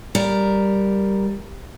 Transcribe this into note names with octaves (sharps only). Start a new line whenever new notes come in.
G3 A#4